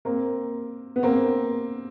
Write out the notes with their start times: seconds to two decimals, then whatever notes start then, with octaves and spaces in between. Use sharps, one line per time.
0.05 A#3 C4
0.96 B3
1.03 A#3 C4